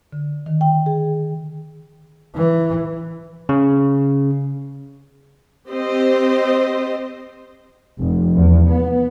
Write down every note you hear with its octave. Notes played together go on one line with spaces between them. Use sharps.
D3
D#3
G5
G#4
E3
C#3
C4 G4 C5 D#5
F1
E2
B3